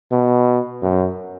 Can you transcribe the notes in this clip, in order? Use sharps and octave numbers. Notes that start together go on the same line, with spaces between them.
B2
F#2